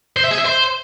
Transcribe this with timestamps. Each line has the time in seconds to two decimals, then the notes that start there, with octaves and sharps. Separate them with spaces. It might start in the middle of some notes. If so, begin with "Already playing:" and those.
0.17 C5
0.24 E5
0.31 G#4
0.39 E5
0.46 C5